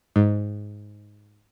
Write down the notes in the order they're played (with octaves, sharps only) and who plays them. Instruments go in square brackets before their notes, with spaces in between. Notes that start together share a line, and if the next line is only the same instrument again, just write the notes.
[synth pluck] G#2